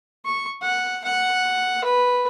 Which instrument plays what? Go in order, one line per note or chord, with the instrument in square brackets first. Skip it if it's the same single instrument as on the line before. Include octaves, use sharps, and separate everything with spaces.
[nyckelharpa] C#6
F#5
F#5
B4